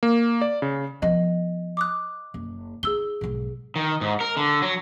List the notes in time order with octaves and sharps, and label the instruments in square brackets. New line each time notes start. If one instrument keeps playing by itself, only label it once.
[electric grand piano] A#3
D5
C#3
[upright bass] F3 B3 [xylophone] D#5
[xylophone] D6 D#6 F#6
[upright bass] F#1
[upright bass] D#4 [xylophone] G#4 E6 G7
[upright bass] B1 G#2
[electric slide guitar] D#3
G#2
A#4
D3
F#3